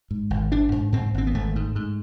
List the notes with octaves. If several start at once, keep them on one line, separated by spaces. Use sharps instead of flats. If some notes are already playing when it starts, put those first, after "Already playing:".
G#2
G#1
G#1 D4
G#2
G#2 C4
G#1 C4
B3
G#1 A3
G#2
G#2